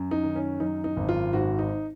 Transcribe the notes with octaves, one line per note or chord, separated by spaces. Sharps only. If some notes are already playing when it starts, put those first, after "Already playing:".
Already playing: F#2
D#4
D#3
C#4
F#2 D#4
D#4
G#1
F4
G#2 F#4
D#4